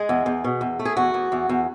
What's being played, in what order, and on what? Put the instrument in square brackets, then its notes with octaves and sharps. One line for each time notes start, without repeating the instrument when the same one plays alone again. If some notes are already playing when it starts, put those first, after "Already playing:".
Already playing: [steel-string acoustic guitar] G#3 G#4
E2
E2
B2
E2
A3
G#4
E2 F#4
E2
E2
E2